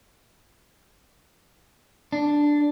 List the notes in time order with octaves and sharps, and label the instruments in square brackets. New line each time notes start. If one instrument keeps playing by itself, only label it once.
[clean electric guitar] D4